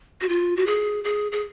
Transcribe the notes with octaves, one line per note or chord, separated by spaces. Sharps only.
F#4
F4
F#4
G#4
G#4
G#4